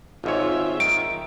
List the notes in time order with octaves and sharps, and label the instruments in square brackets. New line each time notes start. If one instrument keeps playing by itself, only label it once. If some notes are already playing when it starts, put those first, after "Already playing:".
[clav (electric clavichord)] G#1 G#2 C#5 [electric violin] F4 E5
[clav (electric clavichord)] D#3 [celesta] D7